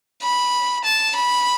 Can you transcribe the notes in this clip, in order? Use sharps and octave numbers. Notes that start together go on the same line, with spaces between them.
B5
A5
B5